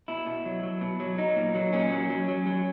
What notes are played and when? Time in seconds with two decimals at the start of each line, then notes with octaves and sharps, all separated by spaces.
0.08 B2 E4
0.26 B2
0.45 F#3
0.63 F#3
0.81 B2
1.00 F#3
1.18 F#3 D#4
1.37 A#2
1.55 F#3
1.73 A#2 C#4
1.92 F#3
2.10 F#3
2.29 F#3
2.46 F#3